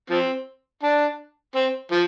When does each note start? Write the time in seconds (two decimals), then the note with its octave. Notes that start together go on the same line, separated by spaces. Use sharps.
0.10 F3 C4
0.83 D4
1.55 C4
1.92 F3